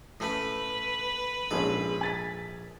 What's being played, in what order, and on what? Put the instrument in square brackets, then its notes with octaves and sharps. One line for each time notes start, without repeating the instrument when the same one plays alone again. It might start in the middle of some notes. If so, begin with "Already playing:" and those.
[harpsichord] A2 A3 C#4 [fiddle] B4
[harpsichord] A#1 A4 [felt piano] G#2 G#3 C#4
[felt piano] G#5 A6 B6